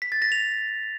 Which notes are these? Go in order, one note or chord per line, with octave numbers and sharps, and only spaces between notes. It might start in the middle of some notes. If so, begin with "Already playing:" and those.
B6
A6
A#6
F7